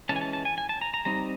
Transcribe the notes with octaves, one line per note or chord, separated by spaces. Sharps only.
E3 G#3 C#4 A5
G#5
A5
A5
G#5
G#5
A5
A#5
A#5
G3 C4 D#4 A#5